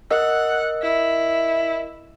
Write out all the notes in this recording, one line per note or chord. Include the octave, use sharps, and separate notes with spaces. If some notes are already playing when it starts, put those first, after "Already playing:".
A#4 D#5 F#5 E6
E4